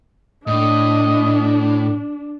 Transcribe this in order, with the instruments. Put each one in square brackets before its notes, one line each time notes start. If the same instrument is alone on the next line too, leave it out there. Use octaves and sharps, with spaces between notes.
[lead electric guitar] A2 [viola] D4 [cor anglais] D#5